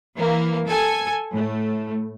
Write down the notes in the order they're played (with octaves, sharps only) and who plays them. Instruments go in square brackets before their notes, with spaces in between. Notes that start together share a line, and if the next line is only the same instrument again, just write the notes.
[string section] E3 A#3
A4 G#5
A2 A3